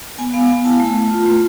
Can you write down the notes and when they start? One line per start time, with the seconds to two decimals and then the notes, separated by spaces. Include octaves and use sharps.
0.18 B3 G#5
0.33 B3 F5
0.49 B3 G#5
0.64 E4 A5
0.80 A3
0.95 A3
1.11 F4
1.26 A3